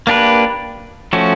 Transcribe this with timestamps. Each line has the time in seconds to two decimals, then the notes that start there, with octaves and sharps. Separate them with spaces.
0.07 A#3 D4 G4 B4
1.13 F3 A3 C#4 F#4